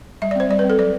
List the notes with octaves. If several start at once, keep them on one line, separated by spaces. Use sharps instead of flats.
G3 E5
D5
C4 C5
G3 D5
B4
C4
A4
F#3 D5